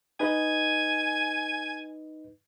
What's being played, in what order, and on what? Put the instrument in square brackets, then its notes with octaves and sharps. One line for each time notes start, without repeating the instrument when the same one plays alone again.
[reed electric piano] D#4 B4 D#5 [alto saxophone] G#5